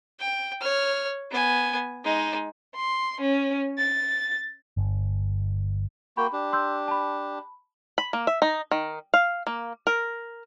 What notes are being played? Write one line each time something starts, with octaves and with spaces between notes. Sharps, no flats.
G5
C#5 F6
B3 G#5
G#3 D#4
C6
C#4
A6
G1
A#3 F#4 G5 B5
D4 G4
C6 E6 G6
A5 B5
B5
A#3
E5
D#4
D#3
F5
A#3
A#4